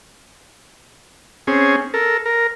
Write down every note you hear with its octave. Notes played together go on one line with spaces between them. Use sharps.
C4 C#4 G#4
A4 A#4
A#4